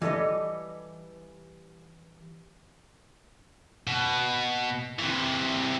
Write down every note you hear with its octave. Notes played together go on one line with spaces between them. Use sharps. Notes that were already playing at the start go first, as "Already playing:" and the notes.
E3 G3 A4 B4 D#5
B2
C3 E3